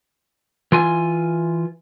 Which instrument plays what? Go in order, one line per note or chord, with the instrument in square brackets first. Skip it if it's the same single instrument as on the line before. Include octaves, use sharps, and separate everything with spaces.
[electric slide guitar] E3 F4 G#5